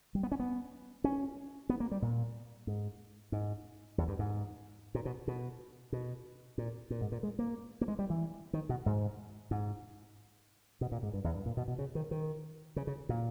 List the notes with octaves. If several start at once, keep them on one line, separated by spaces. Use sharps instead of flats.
G3
B3
C#4
B3
C#4
B3
A#3
G3
A#2
G#2
G#2
E2
G2
G#2
A#2
B2
B2
B2
A#2
A#2
G#2
A#2
G#3
A#3
A#3
G#3
G3
E3
D#3
B2
G#2
G#2
B2
A#2
G#2
G2
E2
G2
A#2
B2
B2
C#3
D#3
D#3
C#3
C#3
A#2